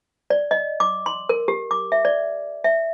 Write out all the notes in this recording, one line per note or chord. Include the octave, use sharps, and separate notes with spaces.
D5
D#5
D6
C6
A#4
G4
D6
E5
D5
E5